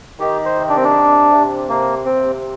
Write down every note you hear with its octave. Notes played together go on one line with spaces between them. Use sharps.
D#3 G4
C5
C3
D4
C4
D4
C3
C3
C3 A#3
C3 C4